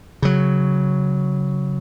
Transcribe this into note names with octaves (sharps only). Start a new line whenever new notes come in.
C#3 F#3